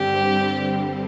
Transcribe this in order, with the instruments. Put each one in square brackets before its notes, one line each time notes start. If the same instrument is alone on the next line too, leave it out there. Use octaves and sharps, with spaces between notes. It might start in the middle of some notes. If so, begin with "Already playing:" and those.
Already playing: [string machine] G2 D3 G3 C4 [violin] G4